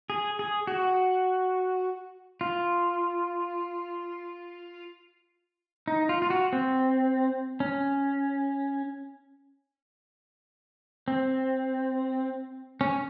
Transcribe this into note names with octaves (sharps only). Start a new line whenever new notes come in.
G#4
G#4
F#4
F4
D#4
F4
F4
F#4
C4
C#4
C4
C#4